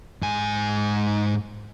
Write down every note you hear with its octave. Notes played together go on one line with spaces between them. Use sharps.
G#2 G#5